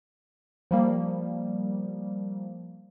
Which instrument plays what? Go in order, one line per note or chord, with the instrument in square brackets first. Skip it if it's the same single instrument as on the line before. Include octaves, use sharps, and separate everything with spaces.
[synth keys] F3 G3 A#3